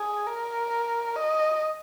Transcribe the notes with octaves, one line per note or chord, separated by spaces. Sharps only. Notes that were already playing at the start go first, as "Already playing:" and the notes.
Already playing: G#4
A#4
D#5